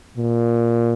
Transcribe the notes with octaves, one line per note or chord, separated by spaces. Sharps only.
A#2